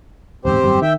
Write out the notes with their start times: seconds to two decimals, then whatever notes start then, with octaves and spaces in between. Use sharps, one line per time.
0.45 D1 E2 G#2 C4 G4 C5
0.62 G#1 F#2 G3
0.82 D#3 E5 G5